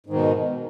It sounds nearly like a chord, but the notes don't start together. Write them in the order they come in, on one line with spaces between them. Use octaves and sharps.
G#2 D#3 B2